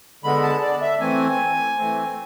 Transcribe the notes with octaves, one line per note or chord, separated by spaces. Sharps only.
D3 G#3 B3 B5
A5
D5
E5
E3 A3 C4 G#5
E3 A3 C4